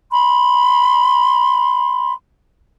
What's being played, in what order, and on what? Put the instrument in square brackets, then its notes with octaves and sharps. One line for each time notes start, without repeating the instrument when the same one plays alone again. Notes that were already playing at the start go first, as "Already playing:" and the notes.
[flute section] B5 C6